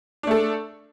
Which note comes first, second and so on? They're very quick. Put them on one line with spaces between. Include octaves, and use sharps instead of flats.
D4 A3 A4